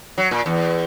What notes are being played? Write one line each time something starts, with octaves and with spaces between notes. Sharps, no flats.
F#3
A#2
E2